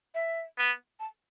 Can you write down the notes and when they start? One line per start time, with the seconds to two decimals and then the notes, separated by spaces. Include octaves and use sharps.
0.15 E5
0.58 B3
1.00 A5